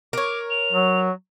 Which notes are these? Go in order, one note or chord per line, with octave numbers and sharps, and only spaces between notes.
A#4 C#5 D6
F7
F#3